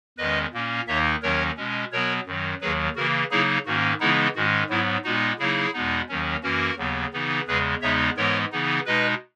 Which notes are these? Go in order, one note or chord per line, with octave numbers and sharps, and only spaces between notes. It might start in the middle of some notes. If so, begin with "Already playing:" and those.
E2 D#3 G#3 C#4 B4 D#5
A#2 A#3 C#4
D#2 D#3 A#3 D#4 C#5 E5
D#2 D#3 F#3 C#4 A#4 C#5
B2 G#3 C#4
B2 F#3 B3 A#4 C#5
F#2 D#3 F#3
D#2 D#3 F#3 G#4 B4
C#3 E3 A#3 F#4 A#4
C#3 F#3 A#3 D#4 E4 G#4
G#2 D#3 A#3 C#4 F#4
C#3 E3 G#3 B3 D#4 E4
G#2 D#3 G#3 C#4 F#4
G#2 F#3 B3 E4
A#2 G#3 B3 D#4 F#4
C#3 F#3 A#3 D#4 E4 G#4
E2 B2 G#3 B3 D#4
D#2 D#3 F#3 C#4
F#2 E3 A#3 C#4 F#4 A#4
D#2 C#3 F#3 B3
C#3 E3 B3 D#4
E2 C#3 G#3 G#4 B4
E2 C#3 G#3 B3 D#4 C#5 E5
G#2 E3 G#3 B3 A#4 C#5
C#3 E3 B3 D#4
B2 G#3 D#4 B4 D#5